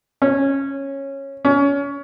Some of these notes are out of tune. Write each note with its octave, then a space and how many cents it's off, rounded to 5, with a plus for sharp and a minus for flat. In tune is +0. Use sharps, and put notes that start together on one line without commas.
C#4 -10
C#4 +30